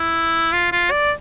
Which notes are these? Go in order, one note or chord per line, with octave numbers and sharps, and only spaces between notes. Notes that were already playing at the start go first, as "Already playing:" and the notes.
Already playing: E4
F4
F4
D5